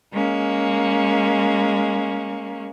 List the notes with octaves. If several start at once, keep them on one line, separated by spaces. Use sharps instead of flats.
G#3 A#3 C#4